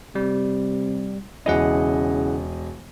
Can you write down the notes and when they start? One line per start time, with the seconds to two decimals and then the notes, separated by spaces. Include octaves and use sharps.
0.15 C3 G3
1.46 E1 C#3 E4 G#4 D#5 F#5